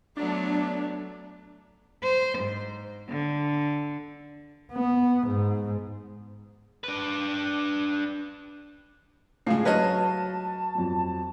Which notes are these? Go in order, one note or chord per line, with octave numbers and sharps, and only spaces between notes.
F#3 A3 B3 D4
C5
G#2
D3
B3
G#2
D4 B4
A2 C#3 G#3 F4 F5 C7
F#3 B4 C#5 D#5 A5 F6 A#6
F2 F#3